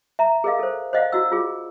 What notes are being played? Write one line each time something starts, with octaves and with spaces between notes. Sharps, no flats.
E5 A#5
G#4 A#4 D#5 F5
A4 C5
C5 D5 D#5 F5 F#5
E4 F#4 D#5 E6
F4 G#4